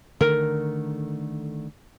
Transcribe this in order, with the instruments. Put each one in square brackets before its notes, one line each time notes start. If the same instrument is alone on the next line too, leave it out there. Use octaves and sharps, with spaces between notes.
[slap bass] D3 D#3 A3 [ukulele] A#4